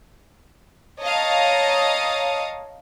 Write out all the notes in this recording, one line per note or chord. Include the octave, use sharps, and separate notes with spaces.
C#5 D#5 F5 A5 A#5 D#6